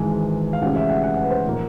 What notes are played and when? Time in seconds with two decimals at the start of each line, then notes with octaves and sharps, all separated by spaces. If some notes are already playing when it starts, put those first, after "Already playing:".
Already playing: G#1 G#2 E3 G#3 G#5
0.53 F5
0.62 D2 C3 E3 G#3 C#4 F#5
0.76 E5
0.90 F#5
1.04 F#5
1.17 F#5
1.24 B4
1.30 C5
1.46 A#2 F3 A#3